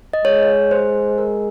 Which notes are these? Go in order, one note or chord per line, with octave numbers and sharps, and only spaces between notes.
D#5
G#3 C#5
C5
A#4